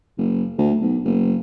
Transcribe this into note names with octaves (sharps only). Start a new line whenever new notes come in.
F#1
D2
B1
F#1